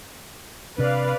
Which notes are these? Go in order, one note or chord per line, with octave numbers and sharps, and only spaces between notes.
C3 D4 B4 D5 F5